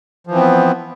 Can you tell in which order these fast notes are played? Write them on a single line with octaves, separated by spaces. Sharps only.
F3 E3 C4 B3